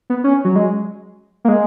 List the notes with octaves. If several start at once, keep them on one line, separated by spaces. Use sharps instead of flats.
B3
C#4
F#3
G#3
A#3
G#3